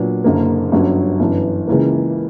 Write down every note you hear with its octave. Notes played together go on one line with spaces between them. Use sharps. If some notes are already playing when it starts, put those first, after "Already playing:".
Already playing: A#2 F#3 B3 D4
F#1 F#2 D3 A#3
G1 G2 F#3 C#4
G1 F#2 E3
C#2 C#3 E3 A#3